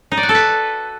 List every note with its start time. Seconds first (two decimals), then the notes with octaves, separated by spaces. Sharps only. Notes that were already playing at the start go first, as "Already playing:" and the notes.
0.12 D#4
0.17 D5
0.23 F#4
0.29 A4
0.35 B4